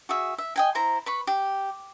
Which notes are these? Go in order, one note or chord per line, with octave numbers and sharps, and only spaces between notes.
F#4 G#4 E5
E5
D#5 G5 G#5
E4 C5 A#5
B4 B5 C#6
G4